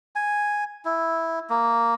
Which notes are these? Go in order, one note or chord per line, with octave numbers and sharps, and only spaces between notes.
G#5
E4
A#3